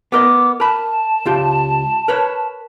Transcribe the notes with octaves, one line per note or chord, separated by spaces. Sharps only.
B3 A#4 D#5 D6
A#4 A5 B5
C#2 F4 G4
A#4 B4 C#5